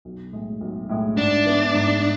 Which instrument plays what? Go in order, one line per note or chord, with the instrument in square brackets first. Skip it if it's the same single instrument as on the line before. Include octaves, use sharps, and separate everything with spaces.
[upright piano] B1
A2 G#3
B1
A2 G#3
[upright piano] G#2 [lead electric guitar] D4
[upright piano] E3 B3
G#2